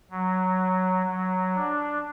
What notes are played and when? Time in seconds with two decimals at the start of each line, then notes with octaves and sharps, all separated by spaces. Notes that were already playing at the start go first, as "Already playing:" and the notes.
0.11 F#3
1.06 F#3
1.55 D4